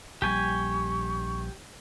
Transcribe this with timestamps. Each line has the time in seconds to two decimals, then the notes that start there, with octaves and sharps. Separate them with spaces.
0.22 A#1 G3 G4 G#5 C#6